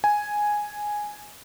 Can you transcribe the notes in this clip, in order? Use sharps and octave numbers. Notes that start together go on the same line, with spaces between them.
G#5